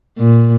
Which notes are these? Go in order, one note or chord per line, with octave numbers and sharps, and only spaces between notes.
A#2